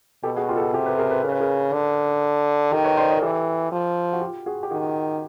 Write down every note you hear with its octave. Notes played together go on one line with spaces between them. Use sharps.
B2 G4 A4
F#4 G#4
F4 G4
A4
F#4 G#4
C3 G4 A4
A4 B4
G#4 A#4
A4 B4
C#3 A#4
B4
G#4 A#4
D3
D#3 G4 A4
B4 C#5
C5 D5
C#5 D#5
A#4
E3 G4 A4
F3
F#4
F4 G4
F#4 G#4
G4
D#3 F#4 G#4